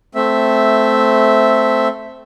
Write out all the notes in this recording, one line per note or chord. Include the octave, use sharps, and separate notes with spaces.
A3 C4 E5